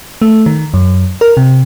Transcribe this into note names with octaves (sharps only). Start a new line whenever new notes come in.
A3
D#3
F#2
A#4
C3